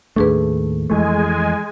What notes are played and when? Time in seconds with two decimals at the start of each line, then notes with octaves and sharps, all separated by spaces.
0.16 D#2 A2 A3 D4 G#4 B4
0.90 F2 E3 G#3 A3 G#5